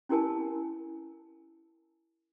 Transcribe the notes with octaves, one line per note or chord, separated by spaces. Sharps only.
C#4 E4 G4 A#4 G#5 A5